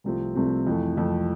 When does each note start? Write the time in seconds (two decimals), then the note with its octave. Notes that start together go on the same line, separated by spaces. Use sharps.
0.04 C2 C3 F3 A3 C4
0.35 C2 C3 F3 A3 C4
0.67 F2 E3 A3
0.97 F2 E3 A3